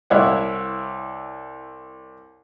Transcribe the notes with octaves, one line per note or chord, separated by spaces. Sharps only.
C2 E4 C#5 D5 F5 F#5